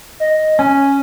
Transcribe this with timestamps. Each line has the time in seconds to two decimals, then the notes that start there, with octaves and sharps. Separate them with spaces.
0.20 D#5
0.59 C#4 G#5